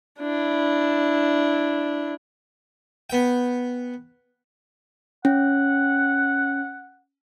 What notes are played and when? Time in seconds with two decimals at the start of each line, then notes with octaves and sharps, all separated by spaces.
0.20 D4 E4
3.10 B3 G5
5.25 C#4 F#5